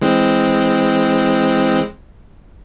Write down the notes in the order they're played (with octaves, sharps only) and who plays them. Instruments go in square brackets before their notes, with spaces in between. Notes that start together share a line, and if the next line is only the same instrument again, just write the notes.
[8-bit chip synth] E3 G#3 C4